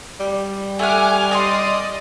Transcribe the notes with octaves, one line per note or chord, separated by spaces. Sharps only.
G3
A3 F#5 G#5 D6 F6
D#4 D5 D#5 F5 C6 D#6